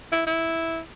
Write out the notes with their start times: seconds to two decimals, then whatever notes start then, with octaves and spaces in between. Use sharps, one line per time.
0.12 E4
0.27 E4